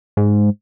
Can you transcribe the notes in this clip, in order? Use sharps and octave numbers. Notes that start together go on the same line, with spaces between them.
G#2